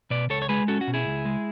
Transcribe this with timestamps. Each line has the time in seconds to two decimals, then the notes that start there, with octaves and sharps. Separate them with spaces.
0.10 B2 B4 D5
0.30 C#2 A4 C#5
0.42 C#5
0.49 G#3 G#4 B4
0.68 C#4 F#4 A4
0.81 F#4
0.87 B2
0.94 E4 G#4
1.07 C#2
1.25 G#3